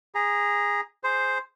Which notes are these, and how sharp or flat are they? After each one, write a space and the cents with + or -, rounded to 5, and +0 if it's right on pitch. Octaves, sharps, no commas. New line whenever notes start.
G#4 -20 A#5 +10
G#4 +0 C5 +0